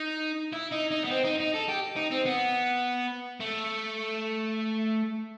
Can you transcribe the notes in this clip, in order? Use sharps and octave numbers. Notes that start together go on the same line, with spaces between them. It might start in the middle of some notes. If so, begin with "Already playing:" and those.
Already playing: D#4
E4
D#4
D#4
B3
C4
D#4
D#4
A4
G4
D#4
C4
B3
A3